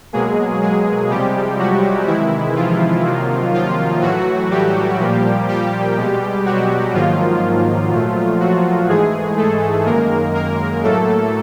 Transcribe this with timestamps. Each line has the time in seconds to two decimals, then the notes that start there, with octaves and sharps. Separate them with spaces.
0.13 B2 F#3 G#3 A#3 G#4
0.62 G#3 G#4
1.10 C3 F3 G3 G#3 G4
1.59 F#3 F#4
2.07 C3 D#3 E3 G#3 E4
2.56 F3 F4
3.05 C3 D#3 F#3 A#3
3.54 F3 F4
4.02 A2 E3 F#3 A3 F#4
4.51 G3 G4
5.00 A#2 F3 A#3
5.49 G3 G4
5.97 B2 G#3
6.46 F#3 F#4
6.94 G#2 D#3 F3 F#3 A#3 F4
7.92 A#2 F#3 A3
8.40 F#3 F#4
8.89 G#2 E3 G#3 A3 G#4
9.37 A3 A4
9.86 F#2 D#3 G#3 A#3 A#4
10.35 A#3 A#4
10.83 A2 F#3 A3 A#3 A4